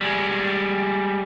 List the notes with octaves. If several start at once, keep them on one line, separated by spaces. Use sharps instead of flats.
G3 G#3